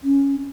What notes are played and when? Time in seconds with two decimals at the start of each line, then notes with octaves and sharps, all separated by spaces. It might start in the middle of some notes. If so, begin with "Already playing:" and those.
0.04 C#4